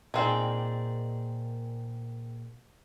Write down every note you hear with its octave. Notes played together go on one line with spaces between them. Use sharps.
A#2 D#3 C4 G#4 D5